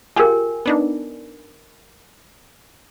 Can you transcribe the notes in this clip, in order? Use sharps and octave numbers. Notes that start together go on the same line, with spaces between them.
F4 G4 G#4 A#4 G#5
B3 D4 D#4